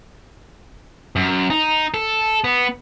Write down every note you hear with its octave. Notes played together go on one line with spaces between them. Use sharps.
F#2
D#4
A4
B3